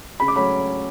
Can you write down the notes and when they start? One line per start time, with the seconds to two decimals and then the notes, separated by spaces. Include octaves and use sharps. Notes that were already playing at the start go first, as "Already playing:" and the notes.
0.20 C#3 B5
0.28 D6
0.36 F#3 A3 C#4 B5